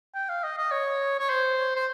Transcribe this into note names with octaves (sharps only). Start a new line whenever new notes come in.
G5
F5
D#5
D#5
C#5
C#5
C5
C5